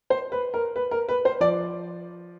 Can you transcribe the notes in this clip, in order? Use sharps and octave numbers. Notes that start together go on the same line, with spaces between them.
C5
B4
A#4
B4
A#4
B4
C5
F3 D5